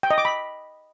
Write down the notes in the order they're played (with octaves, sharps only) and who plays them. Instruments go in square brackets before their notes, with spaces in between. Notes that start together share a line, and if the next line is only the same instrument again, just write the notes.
[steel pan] G5
D#5
D6
B5